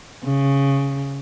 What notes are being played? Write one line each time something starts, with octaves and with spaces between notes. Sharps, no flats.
C#3